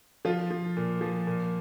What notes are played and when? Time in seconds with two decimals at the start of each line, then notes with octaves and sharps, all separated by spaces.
0.25 F3 F4
0.51 F3
0.77 A#2
1.01 F3
1.27 A#2